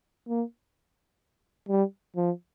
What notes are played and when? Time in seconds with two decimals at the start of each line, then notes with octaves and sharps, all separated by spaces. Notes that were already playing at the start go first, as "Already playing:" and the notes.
0.28 A#3
1.69 G3
2.16 F3